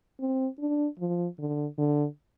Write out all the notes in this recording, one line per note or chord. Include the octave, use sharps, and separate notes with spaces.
C4
D4
F3
D3
D3